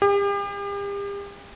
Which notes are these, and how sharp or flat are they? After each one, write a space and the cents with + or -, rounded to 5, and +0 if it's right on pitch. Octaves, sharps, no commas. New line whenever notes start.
G4 +40